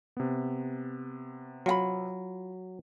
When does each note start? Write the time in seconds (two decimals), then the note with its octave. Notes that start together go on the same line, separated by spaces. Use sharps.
0.17 C3 B3
1.66 F#3 F4 F#5 B5